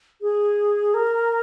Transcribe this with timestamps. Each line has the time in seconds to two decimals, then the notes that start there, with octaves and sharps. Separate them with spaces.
0.22 G#4
0.94 A#4